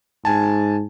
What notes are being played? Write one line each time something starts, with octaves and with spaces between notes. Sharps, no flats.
G#2 G#5 A5